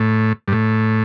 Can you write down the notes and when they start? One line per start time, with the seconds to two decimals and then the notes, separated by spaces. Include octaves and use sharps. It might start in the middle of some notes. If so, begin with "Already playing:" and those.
Already playing: A2
0.48 G2
0.52 A2